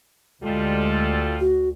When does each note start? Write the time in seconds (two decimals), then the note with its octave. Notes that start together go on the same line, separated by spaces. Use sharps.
0.43 D2 G3 G#3 F4 A4
1.40 F#4